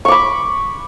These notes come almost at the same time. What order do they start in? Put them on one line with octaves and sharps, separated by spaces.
C#6 D6 B5